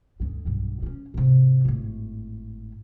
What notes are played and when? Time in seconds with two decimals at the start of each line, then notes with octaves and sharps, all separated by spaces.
0.20 D2 G2
0.45 B1 G2
0.82 C#4 D4
1.14 G#2 C3
1.65 G#1 A2